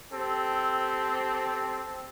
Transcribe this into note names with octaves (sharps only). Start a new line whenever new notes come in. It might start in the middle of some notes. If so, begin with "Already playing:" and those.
C4 G4 A4